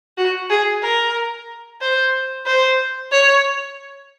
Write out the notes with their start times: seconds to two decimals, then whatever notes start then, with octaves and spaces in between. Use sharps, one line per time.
0.18 F#4
0.50 G#4
0.82 A#4
1.81 C5
2.46 C5
3.12 C#5